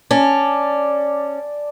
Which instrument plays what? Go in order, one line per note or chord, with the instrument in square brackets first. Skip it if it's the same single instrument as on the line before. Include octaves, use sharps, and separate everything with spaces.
[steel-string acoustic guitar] C#4 [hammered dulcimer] D5 A5